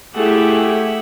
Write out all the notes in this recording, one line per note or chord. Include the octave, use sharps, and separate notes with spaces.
A3 E4 G4 G#4 E5 F#5